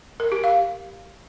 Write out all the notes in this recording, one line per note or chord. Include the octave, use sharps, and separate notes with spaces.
A#4
G4
F5